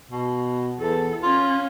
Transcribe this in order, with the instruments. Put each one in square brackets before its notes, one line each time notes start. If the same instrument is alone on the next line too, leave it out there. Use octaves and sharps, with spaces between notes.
[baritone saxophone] B2
[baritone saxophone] E2 [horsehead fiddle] A4
[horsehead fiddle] C#4 [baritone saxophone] F4